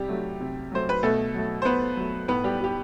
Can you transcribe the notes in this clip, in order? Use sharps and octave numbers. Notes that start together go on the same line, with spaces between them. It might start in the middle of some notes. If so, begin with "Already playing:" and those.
Already playing: C3 G3 G4
F#3 A3
C3
F#3 A3 C5
B4
B2 A3 A4
F#3 A3
C5
B2 B3 B4
F#3 A3
A2 B3 B4
G3 G4
G3 G4